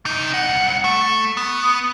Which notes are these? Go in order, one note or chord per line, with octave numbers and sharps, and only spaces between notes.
C3 D#4
C2 F#5
A3
B3